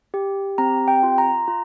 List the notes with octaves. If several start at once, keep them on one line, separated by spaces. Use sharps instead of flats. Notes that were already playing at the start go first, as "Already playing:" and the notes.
G4
C4 A#5
G5
F4
A#5
F4